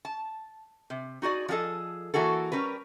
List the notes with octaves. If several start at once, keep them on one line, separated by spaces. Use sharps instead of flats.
A5
C3
D#4 F#4 G#4 D5
F3 F#4 G#4 A4 D#5
E3 A#3 F#4 G#4 A4
G3 C#4 A#4 B4